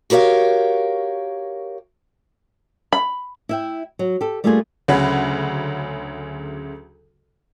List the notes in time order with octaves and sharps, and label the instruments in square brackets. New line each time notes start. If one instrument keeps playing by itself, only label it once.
[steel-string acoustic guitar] F#4 G4 A#4 C#5 F5
[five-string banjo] B5
[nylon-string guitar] E4 E5 G5
F#3
G4 A4
G3 A3 A#3 D4 F4 G#4
[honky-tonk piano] D2 C#3 F#3 G#4 F#5 B5